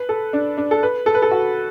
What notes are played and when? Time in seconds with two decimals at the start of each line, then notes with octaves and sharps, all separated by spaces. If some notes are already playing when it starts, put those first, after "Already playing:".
Already playing: B4
0.09 A4
0.33 D4
0.58 D4
0.71 A4
0.83 B4
1.06 A4
1.14 B4
1.22 A4
1.31 F#4